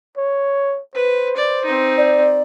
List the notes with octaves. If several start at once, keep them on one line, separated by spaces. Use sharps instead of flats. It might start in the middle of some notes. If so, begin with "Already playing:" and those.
C#5
B4 C5
D5
C4 D#4
D5